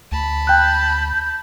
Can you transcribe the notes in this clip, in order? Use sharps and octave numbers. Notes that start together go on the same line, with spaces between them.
D2 A5 B5
G5 F#6 G6